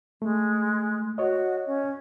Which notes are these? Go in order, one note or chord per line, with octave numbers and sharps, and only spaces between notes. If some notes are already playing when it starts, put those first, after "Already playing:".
G#3 A3
F#4 C#5 D#5
C#4